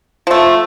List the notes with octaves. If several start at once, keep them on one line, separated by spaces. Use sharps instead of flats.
F3 A3